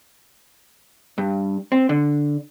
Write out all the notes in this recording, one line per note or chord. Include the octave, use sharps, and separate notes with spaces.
G2
C4
D3